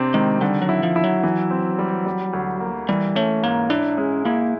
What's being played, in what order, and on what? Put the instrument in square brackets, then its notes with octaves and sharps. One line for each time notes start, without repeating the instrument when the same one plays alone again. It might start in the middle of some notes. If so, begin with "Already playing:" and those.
Already playing: [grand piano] C3 C4 D4
[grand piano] D#3 [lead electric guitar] G#3
[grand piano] D3 [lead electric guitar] G3
[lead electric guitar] F#3
[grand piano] E4
[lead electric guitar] F3
[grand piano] E4
[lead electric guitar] F#3
[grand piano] E3
C4
G3
G3
D2
A#3
[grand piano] E3 [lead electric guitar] G3
[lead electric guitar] A3 [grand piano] C#4
[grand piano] G#2 [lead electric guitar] A#3
[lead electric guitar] D4 [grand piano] E4
[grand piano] G#3 [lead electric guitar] C#4
[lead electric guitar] A#3 [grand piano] E4